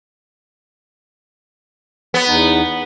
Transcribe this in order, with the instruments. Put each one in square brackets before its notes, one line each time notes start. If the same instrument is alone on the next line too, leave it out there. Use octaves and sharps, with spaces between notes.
[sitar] B3
[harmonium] E2 D#4